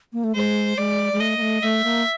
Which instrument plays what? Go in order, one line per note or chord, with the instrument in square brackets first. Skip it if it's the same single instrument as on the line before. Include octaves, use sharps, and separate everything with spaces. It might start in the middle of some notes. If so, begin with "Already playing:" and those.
[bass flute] A#3
A3
[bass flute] G#3 [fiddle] C5
[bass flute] G#3 [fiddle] D5
[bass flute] G#3
[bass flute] A3 [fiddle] D#5
[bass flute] A#3
A3
[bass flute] A3 [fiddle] E5
[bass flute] A#3